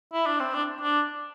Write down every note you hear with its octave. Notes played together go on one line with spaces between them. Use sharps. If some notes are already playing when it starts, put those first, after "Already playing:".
E4
D4
C4
D4
D4